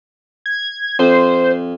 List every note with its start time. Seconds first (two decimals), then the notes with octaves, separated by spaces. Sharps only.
0.46 G#6
0.99 F2 C5